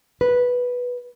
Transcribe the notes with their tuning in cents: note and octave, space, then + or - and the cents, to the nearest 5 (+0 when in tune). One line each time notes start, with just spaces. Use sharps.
B4 -5